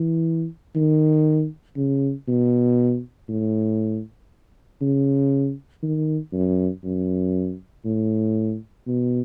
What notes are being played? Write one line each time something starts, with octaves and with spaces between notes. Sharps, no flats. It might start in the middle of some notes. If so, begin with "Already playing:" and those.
Already playing: E3
D#3
C#3
B2
A2
C#3
D#3
F#2
F#2
A2
B2